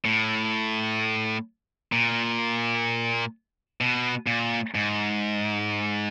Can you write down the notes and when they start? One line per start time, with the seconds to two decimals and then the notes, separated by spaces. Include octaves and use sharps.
0.05 A2
1.92 A#2
3.81 B2
4.27 A#2
4.75 G#2